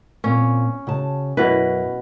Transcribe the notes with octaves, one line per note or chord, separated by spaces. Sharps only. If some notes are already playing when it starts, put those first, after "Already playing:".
A#2 C4 C#4
C#3 F#4 A5
F#2 B2 E4 B4